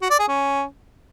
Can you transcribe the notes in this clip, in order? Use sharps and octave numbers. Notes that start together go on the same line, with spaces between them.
F#4
D5
G#4
C#4